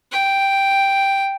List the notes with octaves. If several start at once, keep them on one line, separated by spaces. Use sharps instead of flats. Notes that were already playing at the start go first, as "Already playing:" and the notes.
G5